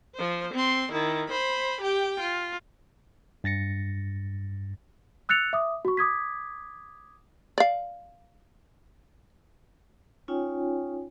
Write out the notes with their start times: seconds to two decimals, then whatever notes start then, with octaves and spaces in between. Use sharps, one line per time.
0.14 F3 C5
0.53 C4 C6
0.92 D#3 E4
1.29 C5 B5
1.81 G4 G5
2.20 F4
3.44 G2 A6 A#6 C#7
5.29 E6 F#6 A6 C#7 F7
5.53 E5 D6 D#6
5.85 F#4 C#6
5.97 D6 D#6 G#6 B6
7.58 D5 F5
10.28 C#4 D#4 F4 C#5 G5 G#5